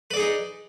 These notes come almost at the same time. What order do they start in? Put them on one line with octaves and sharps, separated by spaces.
B4 D5 G#4 D#4